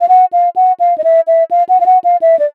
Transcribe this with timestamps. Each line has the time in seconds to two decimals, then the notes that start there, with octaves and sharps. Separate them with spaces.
0.01 F5
0.09 F#5
0.33 F5
0.56 F#5
0.80 F5
0.98 D#5
1.04 E5
1.27 E5
1.51 F5
1.69 F#5
1.80 F5
1.86 F#5
2.04 F5
2.22 E5
2.39 D5